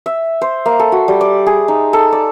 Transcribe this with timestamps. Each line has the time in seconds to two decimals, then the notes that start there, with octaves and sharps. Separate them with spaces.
0.06 E5
0.42 C5
0.66 A#3
0.79 A4
0.92 F#4
1.08 G3
1.21 D5
1.46 G#4
1.68 D#4
1.93 A4
2.12 D5